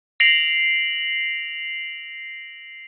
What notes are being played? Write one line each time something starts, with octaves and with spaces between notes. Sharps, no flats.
A#6 C7 D7 F7 F#7